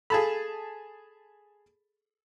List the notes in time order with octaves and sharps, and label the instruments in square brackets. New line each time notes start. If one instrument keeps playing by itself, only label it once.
[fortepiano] G#4 A5 B5 [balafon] A4 F5